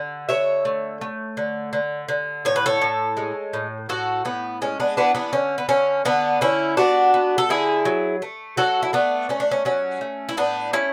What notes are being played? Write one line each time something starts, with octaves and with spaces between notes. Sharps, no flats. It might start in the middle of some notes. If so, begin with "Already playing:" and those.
Already playing: D3
D3 C#5 E5
A3
A3
D3
D3
D3
A2 C#5
B4
A4 C#5
A2
G#3
A2
A2 F#4 A4
A2 B3
G#3 C#4
B3 D4
E3 B3 D4
B3 D4
D3 C#4
B3
D3 C#4
D3 B3 D4
D3 C#4 E4
B3 D4 F#4
B3
A4
D3 E4 G#4
F#3
A3
F#3 F#4 A4
E4
A3 B3 D4
A3 C#4
D4
C#4
F#3 C#4
A3
E4
A2 B3 D4
A3 C#4 E4